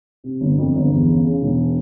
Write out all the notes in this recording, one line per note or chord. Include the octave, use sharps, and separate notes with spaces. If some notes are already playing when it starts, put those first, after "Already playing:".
C3
G1
F2
G1
E2
C#3
C#3
E1